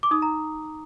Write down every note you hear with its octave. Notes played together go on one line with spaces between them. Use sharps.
D6
D#4 D#6
A#5